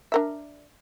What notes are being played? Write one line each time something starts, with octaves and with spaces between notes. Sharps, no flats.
D4 A#4 E5